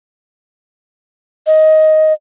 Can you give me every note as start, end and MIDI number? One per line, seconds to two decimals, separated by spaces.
1.47 2.13 75